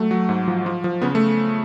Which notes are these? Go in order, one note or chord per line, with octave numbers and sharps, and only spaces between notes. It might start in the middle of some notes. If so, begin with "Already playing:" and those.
Already playing: F#3 A3
F#3
G#2
F3
F3
F3
C#3 B3
A3